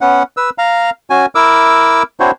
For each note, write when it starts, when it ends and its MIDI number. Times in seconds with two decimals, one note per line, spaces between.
0.01 0.23 59
0.01 0.23 61
0.01 0.23 78
0.37 0.50 71
0.37 0.50 88
0.58 0.90 77
0.58 0.90 82
1.10 1.26 61
1.10 1.26 66
1.10 1.26 80
1.35 2.03 64
1.35 2.03 70
1.35 2.03 86
1.35 2.03 88
2.20 2.31 60
2.20 2.31 62
2.20 2.31 64
2.20 2.31 66
2.20 2.31 72
2.20 2.31 73